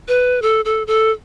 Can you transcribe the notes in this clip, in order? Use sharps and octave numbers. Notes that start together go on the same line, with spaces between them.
B4
A4
A4
A4